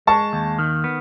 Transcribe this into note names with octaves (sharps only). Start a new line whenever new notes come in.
G#3 A5 C#6
D#2
D#3
B3